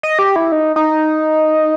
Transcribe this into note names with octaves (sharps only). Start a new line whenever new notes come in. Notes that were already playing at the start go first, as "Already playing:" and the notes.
D#5
G4
E4
D#4
D#4